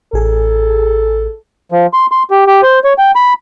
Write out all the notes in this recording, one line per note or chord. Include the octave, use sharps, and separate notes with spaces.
A1 G#4 A4
F3
C6
C6
G4
G4
C5
C#5
G5
B5